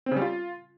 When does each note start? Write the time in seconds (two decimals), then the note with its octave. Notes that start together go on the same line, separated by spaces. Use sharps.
0.06 C4
0.11 C#3
0.16 G3
0.22 F4